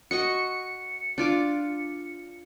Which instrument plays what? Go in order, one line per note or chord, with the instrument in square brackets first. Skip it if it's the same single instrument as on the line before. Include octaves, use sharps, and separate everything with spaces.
[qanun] F#4 D#5 C#6 [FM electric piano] C#7
[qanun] D4 F4 D6